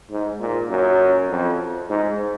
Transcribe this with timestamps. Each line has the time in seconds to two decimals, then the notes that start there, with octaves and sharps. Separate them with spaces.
0.11 G#2
0.40 A#2
0.70 F#2
1.30 F2
1.89 G#2